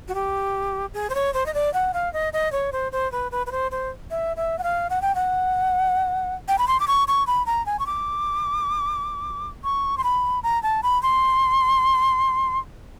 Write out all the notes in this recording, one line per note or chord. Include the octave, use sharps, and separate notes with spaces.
F#4
G4
G#4
C5
C#5
C5
D#5
D5
F#5
F5
D#5
D#5
C#5
C5
C5
B4
B4
B4
C5
C5
E5
E5
F#5
F5
F#5
G5
F#5
G5
B5
C6
D6
C#6
C#6
B5
A#5
G#5
C#6
D6
C#6
C6
B5
A#5
A5
B5
C6